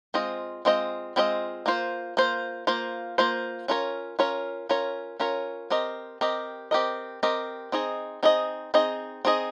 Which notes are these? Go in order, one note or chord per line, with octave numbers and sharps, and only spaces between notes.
G#3 C4 F4 C5 D#5
G#3 C4 F4 C5 D#5
G#3 C4 F4 C5 D#5
A#3 F4 C5
A#3 F4 C5
A#3 F4 C5
A#3 F4 C5
C#4 F4 A#4 C#5
C#4 F4 A#4 C#5
C#4 F4 A#4 C#5
C#4 F4 A#4 C#5
C4 G4 A#4 D#5
C4 G4 A#4 D#5
C4 G4 A#4 D#5
C4 G4 A#4 D#5
C4 D#4 G#4 D#5
C4 D#4 G#4 D#5
C4 D#4 G#4 D#5
C4 D#4 G#4 D#5